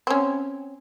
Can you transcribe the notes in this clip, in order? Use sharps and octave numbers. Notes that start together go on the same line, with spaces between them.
C4 C#4